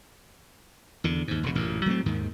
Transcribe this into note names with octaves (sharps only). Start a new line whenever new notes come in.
E2 D3
D#2 G#2
E1 D2 C#3
A1 F#2 A#2
F#3 A3 B3 C4
D#2 G#2 D#3